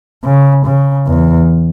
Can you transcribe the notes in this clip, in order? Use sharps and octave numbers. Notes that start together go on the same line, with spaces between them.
C#3
C#3
E2